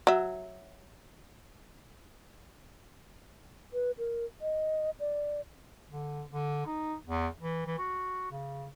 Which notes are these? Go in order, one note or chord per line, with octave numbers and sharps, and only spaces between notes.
F#3 E5
B4
A#4
D#5
D5
D3
D3
D#4
E2
E3
E3
F#4
C#3